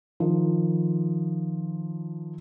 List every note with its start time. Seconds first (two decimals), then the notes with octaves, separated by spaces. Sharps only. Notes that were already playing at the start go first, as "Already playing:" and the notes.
0.20 D#3 F3